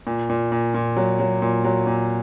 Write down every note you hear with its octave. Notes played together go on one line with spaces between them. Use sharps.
A#2
A#2
A#2
A#2
F#3
F#3
A#2
F#3
A#2